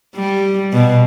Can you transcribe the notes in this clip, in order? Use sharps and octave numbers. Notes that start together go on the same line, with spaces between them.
G3
B2